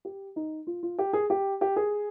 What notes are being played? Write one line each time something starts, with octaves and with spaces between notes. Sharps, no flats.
G4
D#4
F4
F4
G4
G#4
G4
G4
G#4